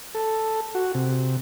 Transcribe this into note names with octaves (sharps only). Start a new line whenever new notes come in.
A4
F#4
C3